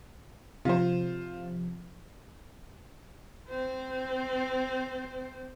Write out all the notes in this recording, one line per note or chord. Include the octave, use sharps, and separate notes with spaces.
C3 F3 F4 C5
C4 C5